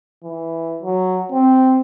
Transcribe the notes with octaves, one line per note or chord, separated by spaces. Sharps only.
E3
F#3
C4